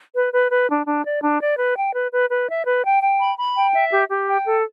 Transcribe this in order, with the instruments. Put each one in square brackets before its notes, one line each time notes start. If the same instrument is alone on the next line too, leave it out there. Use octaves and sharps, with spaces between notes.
[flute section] B4
B4
B4
D4
D4
D5
D4
D5
B4
G5
B4
B4
B4
E5
B4
G5
G5
B5
B5
G5
E5
G4
G4
G5
A4